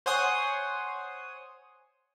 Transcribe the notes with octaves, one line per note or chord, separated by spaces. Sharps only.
C5 C#5 F#5 G#5 C6 D#6